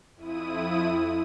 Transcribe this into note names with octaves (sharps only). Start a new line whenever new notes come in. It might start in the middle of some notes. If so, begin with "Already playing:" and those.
F2 E4 D#6 D#7